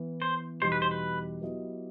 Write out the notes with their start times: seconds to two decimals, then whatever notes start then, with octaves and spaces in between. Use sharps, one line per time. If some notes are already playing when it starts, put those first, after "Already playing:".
Already playing: E3 B3 E4 B4
0.22 C5
0.62 E2 B2 G3 D#4 G4 C5
0.72 B4
0.82 C5
0.91 B4
1.41 F#3 B3 E4 G4 D#5